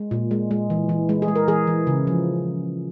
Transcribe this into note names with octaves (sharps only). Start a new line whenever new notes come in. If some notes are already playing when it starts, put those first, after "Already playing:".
Already playing: G#3
A#2
G#3
G#3
E3
E3
G#3
G#4
G#3
A#4
E3 G#4
E3
C#3
F3